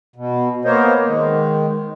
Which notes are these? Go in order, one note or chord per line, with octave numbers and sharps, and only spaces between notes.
B2
A#3 B3 A#4 C5 C#5 D#5
D#3 G#3